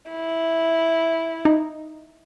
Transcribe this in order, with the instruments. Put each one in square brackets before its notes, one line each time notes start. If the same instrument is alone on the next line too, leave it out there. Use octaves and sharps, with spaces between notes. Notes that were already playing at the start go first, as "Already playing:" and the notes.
[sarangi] E4
[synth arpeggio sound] D#4